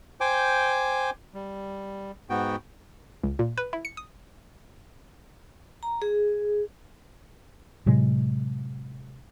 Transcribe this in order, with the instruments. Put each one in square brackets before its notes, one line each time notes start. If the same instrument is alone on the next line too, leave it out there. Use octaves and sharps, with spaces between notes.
[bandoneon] C5 G5 G#5 D6
G3
G#2 B3 F#4 G5
[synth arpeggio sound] C#2
A#2
B4
E4
C#7
D#6
[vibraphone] A#5
G#4
[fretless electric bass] A2 C3 F#3 G#3